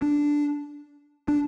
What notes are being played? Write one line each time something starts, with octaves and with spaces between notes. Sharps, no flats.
D4
D4